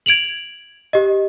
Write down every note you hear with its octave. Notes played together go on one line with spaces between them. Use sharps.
G#6 D7 F7 F#7
G4 D#5